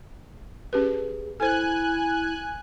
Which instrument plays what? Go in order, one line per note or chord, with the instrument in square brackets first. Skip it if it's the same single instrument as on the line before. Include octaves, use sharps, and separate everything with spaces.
[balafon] C#4 G4 B4 [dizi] G#4
[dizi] E4 [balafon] A4 C5 [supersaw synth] G#5 F#6